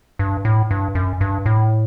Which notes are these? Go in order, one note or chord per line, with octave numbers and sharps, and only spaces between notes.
G2
A2
G2
F#2
G2
A2